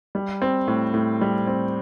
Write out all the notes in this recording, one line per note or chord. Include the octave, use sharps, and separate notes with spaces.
G3
C4
A2
A2
G3
C4